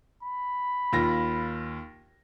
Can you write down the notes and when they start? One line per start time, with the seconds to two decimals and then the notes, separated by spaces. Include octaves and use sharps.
0.23 B5
0.93 D#2 F4 A#6